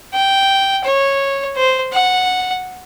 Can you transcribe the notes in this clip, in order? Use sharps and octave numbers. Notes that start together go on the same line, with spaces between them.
G5
C#5
C5
F#5